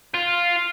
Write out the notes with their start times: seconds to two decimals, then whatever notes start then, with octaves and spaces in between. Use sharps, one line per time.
0.14 F4